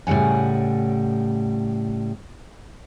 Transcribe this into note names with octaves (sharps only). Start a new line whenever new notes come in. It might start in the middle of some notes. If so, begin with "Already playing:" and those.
A2 C#3 G3 F#5 G#5